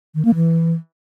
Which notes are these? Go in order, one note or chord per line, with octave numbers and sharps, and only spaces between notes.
D#3
A#3
E3